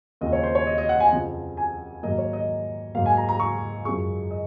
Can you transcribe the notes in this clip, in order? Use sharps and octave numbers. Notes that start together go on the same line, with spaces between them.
D#2 C#3 F3 C4 D#5
C#5
C5
C#5
D#5
D#5
F#5
G#5
F2 C#3 F3
G#5
G#2 D#3 F#3 A#3 D#5
C#5
D#5
G#2 F#3 A#3 F5
G#5
A#5
A#5
C#6
F#2 F3 G#3 C#6
D#5